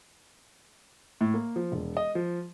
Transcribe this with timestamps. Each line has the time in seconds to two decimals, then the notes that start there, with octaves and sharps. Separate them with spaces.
1.21 A2
1.34 A#3
1.56 F3
1.72 E1
1.97 D#5
2.15 F3